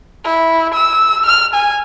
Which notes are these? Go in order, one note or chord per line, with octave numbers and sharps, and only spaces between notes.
E4
E6
F6
G#5